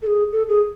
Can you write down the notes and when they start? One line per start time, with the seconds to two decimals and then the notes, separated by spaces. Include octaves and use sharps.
0.02 A4
0.06 G#4
0.32 A4
0.48 G#4